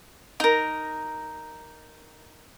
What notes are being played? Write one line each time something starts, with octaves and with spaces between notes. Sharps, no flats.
D#4 A#4